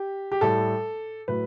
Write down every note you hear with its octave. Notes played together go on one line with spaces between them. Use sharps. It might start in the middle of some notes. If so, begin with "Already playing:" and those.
Already playing: G4
G4
A2 G3 A4
A2 F#3 A3 B4